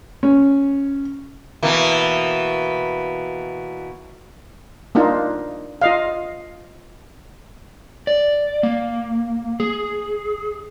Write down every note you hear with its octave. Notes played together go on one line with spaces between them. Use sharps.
C#4
B2 E3 A#3
A#3 D4 D#4 F4
F4 D#5 F5
D5
A#3
G#4